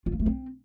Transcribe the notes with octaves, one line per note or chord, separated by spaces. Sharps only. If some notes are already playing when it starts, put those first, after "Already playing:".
F4
A#3
A3
C4